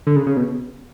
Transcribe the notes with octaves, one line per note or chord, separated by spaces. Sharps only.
D3
C#3
C#3
B2